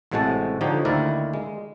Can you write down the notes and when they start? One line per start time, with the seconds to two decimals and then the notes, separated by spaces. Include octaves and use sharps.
0.11 A1 A2 C3 G#3 F#4 A5
0.61 D3 F3 D#4 G4 C#5
0.85 D2 D#3 A#3 E4 A#4 D5
1.34 G#3